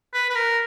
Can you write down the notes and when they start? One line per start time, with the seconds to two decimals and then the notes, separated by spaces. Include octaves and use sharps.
0.14 B4
0.30 B4
0.35 A#4